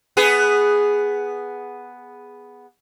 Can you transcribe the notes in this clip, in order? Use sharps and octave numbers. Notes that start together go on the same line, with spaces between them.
B3 G#4